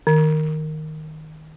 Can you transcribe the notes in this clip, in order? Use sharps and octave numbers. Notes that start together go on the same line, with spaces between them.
D#3